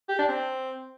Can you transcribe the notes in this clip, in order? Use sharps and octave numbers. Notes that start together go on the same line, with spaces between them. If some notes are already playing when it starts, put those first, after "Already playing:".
G4
D4
C4